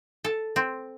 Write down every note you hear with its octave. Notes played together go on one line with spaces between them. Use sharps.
A4
C4